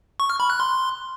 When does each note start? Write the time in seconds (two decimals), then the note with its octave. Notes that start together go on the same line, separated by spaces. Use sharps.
0.20 C#6
0.30 F6
0.40 B5
0.50 F#6
0.60 C6